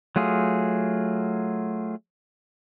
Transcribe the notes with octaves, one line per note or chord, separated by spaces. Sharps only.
F#3 A3 F4 G#4